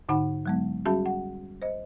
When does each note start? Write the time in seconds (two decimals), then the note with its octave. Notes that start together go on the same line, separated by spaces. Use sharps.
0.09 G#2 D3 D#4 F#5 B5
0.46 F#3 G#3 B3
0.85 G3 C#4 F#4 G#4 E5 A5
1.06 F#5
1.62 C5 D#5